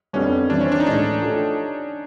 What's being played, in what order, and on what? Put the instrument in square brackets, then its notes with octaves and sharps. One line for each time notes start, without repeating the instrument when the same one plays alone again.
[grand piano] F2 D3 G3 B3 D4 [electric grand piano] C#4
[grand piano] E3 G3 C4 E4 [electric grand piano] D4
[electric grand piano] C#4
D4
D#4
[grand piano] A2 E3 G#3 [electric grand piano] D4
[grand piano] F3 A3 D4 G4